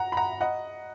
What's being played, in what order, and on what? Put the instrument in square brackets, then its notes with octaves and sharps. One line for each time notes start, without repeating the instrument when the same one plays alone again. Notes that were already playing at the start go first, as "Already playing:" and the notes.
Already playing: [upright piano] F#5 A#5
B5
F#5 A#5
D#5 F#5